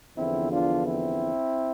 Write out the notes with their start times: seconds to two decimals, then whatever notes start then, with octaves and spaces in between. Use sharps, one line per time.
0.17 E2 D3 F3 B3 C4 E4
0.51 D4 F4
0.87 C4 E4